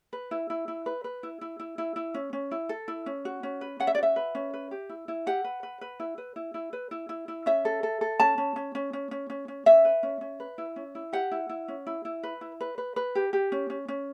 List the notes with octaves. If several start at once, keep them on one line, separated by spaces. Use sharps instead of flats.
B4
E4
E4
E4
B4
B4
E4
E4
E4
E4
E4
C#4
C#4
E4
A4
E4
C#4
F#4
C#4
B4
C#4 F#5
E5
D5
F#4 E5
B4
C#4
B4
G4
E4
E4
G4 F#5
B4
B4
B4
E4
B4
E4
E4
B4
E4
E4
E4
C#4 E5
A4
A4
A4
C#4 A5
C#4
C#4
C#4
C#4
C#4
C#4
C#4
C#4 E5
B4
C#4
C#4
B4
E4
C#4
E4
G4 F#5
E4
E4
C#4
E4
E4
B4
E4
B4
B4
B4
G4
G4
C#4
C#4
C#4